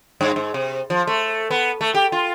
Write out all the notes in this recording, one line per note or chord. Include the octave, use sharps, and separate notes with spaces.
G2
G#2
C3
F3
A3
B3
A3
G4
F4